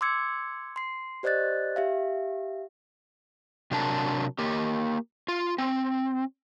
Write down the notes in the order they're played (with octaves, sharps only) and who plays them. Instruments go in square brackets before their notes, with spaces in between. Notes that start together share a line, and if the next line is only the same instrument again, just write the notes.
[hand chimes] C6 D6 E6 G#6 C#7
C6 C7
G4 C5 D5 D#5 F#6 A6
G4 E5 F5
[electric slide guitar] C3 F#3 D4 A#4 A5
A#3 G4
F4
C4